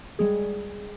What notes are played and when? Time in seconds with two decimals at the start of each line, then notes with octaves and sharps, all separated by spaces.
0.19 G3 G#3 G#4